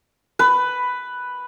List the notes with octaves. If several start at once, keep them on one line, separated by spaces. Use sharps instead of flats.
B4